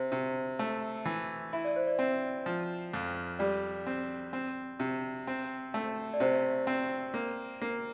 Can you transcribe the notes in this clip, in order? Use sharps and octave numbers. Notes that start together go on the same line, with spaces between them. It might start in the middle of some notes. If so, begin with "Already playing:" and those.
Already playing: C3 C5
C3
A3
E3
E4 E5
D5
C5
D5
C4
F3
F2
G3 D5
C4
C4
C3
C4
A3
D5
C3 C5
C4
A#3
A#3